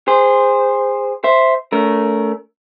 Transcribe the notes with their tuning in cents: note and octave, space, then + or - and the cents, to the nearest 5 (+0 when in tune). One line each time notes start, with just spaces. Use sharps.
G#4 -25 C5 -5
C5 +0 E5 +0
A3 +0 C#4 +45 A#4 +0